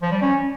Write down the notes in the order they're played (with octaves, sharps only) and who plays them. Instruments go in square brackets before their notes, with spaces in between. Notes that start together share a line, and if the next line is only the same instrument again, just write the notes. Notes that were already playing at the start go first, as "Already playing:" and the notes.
[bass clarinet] F3
G3
C#4